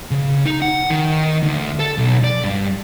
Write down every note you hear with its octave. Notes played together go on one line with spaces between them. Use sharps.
C#3
D#4
F#5
D#3
D2
A4
B1
D5
G2